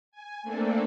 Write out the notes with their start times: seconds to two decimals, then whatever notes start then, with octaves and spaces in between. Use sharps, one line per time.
0.11 G#5
0.43 A3 A#3 C4 D4 A4